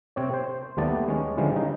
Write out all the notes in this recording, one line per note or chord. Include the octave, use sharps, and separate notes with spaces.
C3 C4 C#5
C5
D#2 G3 A3 B3 D5 A5
G#3 C#4
D3 E3 F3 G3 G#3 C#4
C#3 D#4